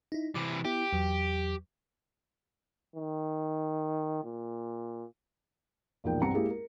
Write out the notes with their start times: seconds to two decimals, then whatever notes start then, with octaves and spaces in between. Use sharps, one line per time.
0.12 D#4 E4
0.35 C3 E3 D6
0.65 B3 E4 G4
0.92 E2 F#3
2.96 D#3
4.24 A#2
6.04 E1 A#1 F3 D#4 A#4 G5
6.21 C2 G2 C4 F#5 A#5 C#7
6.34 G#3 A#3 E4 G4 G#4
6.50 A#4